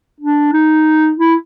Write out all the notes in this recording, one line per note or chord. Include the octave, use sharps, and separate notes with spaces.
D4
D#4
E4